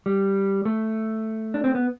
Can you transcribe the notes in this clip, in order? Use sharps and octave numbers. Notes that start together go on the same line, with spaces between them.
G3
A3
D4
C4
B3